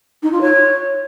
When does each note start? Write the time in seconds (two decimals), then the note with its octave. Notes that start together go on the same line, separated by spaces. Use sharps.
0.22 D#4
0.31 F4
0.41 C#5